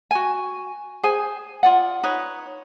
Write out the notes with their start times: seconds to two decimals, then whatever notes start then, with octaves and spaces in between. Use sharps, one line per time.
0.11 F#4 G#5
1.03 G#4 C5 G#5
1.63 F4 D5 F#5
2.03 D#4 B4 C#5